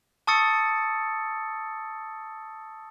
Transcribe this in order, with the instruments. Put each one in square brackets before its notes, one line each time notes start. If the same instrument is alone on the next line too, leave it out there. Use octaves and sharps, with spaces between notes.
[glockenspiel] A5 C#6 D#6 E6 A6 C#7